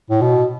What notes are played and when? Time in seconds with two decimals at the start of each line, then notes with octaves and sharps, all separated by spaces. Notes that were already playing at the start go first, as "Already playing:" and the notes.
0.10 A2
0.21 B2